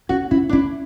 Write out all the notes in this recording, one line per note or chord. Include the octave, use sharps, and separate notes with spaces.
C#4 F#4
C#4 E4
D4
C#4 E4